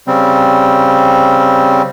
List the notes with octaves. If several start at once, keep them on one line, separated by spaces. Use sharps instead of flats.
C#3 G3 C4